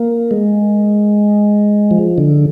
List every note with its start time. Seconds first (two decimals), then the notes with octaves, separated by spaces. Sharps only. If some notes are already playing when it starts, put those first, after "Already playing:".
Already playing: A#3
0.31 G#3
1.91 F3
2.18 D3